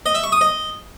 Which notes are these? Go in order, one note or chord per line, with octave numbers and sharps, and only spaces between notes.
D#5
E5
C#6
D#6
D#5